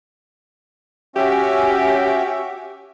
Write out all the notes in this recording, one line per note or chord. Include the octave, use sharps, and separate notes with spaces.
C#4 F#4 G4 E5